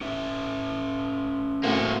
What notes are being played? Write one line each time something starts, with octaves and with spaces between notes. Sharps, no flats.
C#4 B4 E5
A2 A#3 C4 F#4